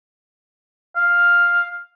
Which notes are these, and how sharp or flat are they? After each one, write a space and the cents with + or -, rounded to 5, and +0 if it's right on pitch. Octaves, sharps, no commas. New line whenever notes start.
F5 +5